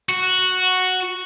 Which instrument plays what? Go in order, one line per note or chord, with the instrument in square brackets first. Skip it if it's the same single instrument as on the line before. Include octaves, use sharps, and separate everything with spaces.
[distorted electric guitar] F#4